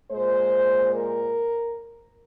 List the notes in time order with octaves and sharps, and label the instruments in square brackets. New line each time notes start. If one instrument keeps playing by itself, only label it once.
[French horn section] A#2 G#3 C5
A#4